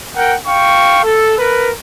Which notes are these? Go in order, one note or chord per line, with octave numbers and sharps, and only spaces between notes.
A#4 F#5 G5
F5 G5 C#6
A4
A#4 B4